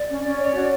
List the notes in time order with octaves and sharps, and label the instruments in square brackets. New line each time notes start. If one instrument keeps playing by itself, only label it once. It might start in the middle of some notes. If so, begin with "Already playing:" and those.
Already playing: [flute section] D5
C#4
C#4
C#5
F#4